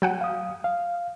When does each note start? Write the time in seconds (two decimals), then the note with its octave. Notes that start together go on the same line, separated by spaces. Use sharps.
0.02 F#3 F#5 G5
0.21 F5 D#6
0.64 F5